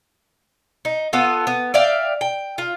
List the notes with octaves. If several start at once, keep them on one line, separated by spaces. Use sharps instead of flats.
D#4
B3 F4 A4
B3
D5 E5 F5 G5
G5
F4